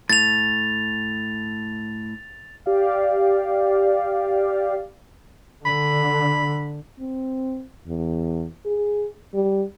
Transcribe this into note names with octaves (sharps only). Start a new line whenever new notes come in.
A2 A6 F7
G4 D5 F5
D3 B5
C4
E2
G#4
G3